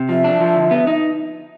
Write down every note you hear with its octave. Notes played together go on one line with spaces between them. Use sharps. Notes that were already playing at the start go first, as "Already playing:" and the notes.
Already playing: C3
F3 E5
D4
F3
D3
B3
D#4